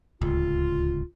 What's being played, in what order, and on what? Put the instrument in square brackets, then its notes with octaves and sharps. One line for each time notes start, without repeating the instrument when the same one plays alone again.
[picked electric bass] D1 C#2 [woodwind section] F4